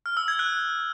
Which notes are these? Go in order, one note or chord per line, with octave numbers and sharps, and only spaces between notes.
F6
E6
G#6
F#6